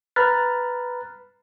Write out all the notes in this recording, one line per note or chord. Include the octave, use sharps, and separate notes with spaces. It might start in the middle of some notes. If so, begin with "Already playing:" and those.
B4 A#5 B5 F6 F#6 A6